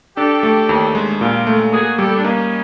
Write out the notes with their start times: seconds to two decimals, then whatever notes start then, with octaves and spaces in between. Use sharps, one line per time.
0.17 D4 G4 A4
0.43 A3
0.69 D#2
0.95 G#3
1.21 A#2 F4 G4
1.47 A3
1.72 A#3 F#4 G#4
1.98 G3 G4 A4
2.17 D4
2.24 A#3 C#4 D#4